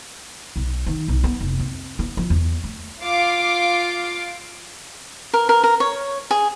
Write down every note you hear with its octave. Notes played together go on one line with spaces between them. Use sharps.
B1
D#3
B1
B3
F1
C4
B3
F3
E2
A3
F4 F5 D6
A#4
A#4
A#4
C#5
G#4